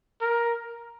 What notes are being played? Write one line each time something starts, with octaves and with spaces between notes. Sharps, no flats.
A#4